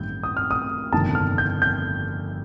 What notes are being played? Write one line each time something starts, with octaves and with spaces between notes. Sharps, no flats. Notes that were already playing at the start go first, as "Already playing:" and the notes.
Already playing: A1 G2 D#3 G3 A#3 G6
D#6
F6
D#6
G1 F2 C3 D#3 A5
F6
G6
G6